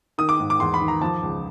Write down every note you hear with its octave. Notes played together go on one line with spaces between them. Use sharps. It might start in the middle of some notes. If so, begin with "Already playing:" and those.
D#3 D#6
D6
G#2
D6
E2 C6
B5
D#3
A#5
F3 A5
C#2